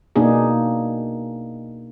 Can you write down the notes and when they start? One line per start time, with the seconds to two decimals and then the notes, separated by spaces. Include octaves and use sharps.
0.16 B2 A#3 D4 D#4 G#4